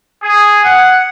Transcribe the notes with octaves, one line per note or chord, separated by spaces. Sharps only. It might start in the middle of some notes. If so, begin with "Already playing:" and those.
G#4
F#5